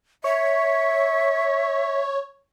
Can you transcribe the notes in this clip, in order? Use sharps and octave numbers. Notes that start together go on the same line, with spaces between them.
C#5 E5